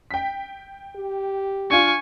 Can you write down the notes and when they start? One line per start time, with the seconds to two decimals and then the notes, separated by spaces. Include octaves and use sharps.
0.11 G5 B6
0.96 G4
1.70 D4 F4 G#5 C#6